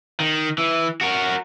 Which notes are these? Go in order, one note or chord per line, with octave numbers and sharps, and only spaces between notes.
D#3
E3
F#4 A#4